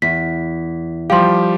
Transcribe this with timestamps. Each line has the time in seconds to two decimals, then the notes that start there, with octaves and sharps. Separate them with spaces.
0.02 E2 B6
1.10 F3 G3 G4 F5 C6